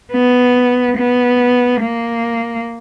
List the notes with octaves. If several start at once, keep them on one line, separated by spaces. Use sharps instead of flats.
B3
B3
A#3